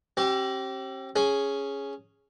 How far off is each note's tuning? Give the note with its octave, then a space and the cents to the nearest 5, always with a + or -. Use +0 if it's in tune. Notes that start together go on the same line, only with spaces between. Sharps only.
C4 +45 G4 -25
C#4 +0 G#4 +0